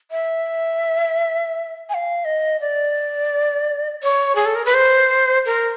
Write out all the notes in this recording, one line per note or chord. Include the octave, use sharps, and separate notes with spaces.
E5
G#5
F5
D#5
D5
C#5
G#4
A4
A#4
B4
C5
A#4